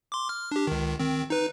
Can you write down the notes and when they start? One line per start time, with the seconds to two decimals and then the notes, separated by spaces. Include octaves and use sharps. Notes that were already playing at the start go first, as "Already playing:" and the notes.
0.12 C6 D6
0.29 F6
0.52 D4 G4
0.67 C#2 D#3
0.99 D#3 C4
1.30 D#4 B4